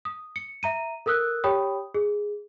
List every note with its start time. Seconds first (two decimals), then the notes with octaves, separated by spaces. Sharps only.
0.05 D#6
0.36 C#7
0.63 E5 A#5 D#7
1.06 A4 A#4 D#6 E6 F#6
1.44 G4 C#5 G5 B5 D#6
1.95 G#4